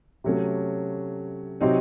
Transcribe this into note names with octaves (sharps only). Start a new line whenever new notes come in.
C3 F#3 A3 C#4
C3 F#3 C4 D#4 F#4